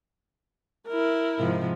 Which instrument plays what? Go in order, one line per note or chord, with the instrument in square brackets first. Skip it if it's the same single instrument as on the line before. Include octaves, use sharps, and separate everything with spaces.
[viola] E4 A#4
[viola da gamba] G#2 C3 F3